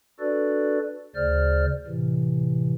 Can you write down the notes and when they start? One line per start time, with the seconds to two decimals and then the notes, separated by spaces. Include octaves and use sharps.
0.20 D4 F#4 A4 B4 D5
1.15 D2 C#3 C5 D5 F6
1.87 A2 C3 E3